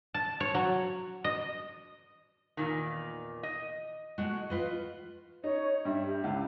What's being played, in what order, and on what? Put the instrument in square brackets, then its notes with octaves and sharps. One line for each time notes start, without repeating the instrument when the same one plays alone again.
[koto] A5
C#5
F#3
D#5
[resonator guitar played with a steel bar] E2 A#2 D#3
D#5
[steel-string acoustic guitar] G#3 A3 F#4
F4 B4 D#5
[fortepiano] D#4 [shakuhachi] C#5
[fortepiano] G2 [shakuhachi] E5
[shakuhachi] G4
[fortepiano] C#2 [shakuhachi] E4